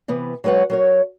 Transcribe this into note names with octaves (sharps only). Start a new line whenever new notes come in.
C3 E3 B3
F#3 G#3 B4 C#5 F#5
F#3 A#4 C#5